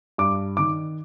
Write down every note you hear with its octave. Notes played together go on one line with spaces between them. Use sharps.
G2 D6
D#3 D6